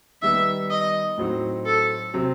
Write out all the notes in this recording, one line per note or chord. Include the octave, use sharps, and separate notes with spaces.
D#3 G3 B3 D#4 E5
D#5
A2 F#3 C4 D#4 F#4
A4
C3 F#3 C4